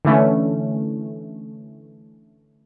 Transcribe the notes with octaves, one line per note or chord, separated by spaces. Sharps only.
D3 E3 A3 C#4